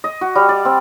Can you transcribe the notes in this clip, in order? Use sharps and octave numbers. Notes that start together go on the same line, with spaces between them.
D#5
F#4
G3
D5
C4